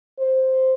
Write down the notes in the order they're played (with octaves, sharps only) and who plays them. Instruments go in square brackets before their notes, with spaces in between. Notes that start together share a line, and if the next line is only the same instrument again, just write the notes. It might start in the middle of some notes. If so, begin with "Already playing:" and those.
[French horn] C5